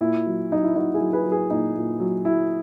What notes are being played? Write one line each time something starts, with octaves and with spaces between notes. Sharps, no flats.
A#2 E4
F#3
F#3 D#4
E4
F#3 D#4 F#4
E4 G#4
F#3
G#4 B4
F#3
G#4 B4
A#2 D#4
A#2
F#3
F#3 E4